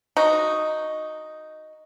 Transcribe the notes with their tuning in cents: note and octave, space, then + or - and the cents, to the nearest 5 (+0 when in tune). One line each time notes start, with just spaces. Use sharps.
D#4 +0 F#4 +0